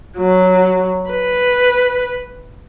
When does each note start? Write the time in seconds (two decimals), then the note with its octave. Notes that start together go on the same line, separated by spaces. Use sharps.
0.18 F#3
1.10 B4